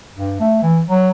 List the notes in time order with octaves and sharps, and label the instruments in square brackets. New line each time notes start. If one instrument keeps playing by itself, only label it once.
[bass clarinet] G2
A3
E3
F#3